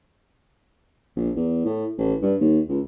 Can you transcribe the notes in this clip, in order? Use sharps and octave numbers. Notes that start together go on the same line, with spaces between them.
A#1
E2
A2
A1
G2
D#2
C#2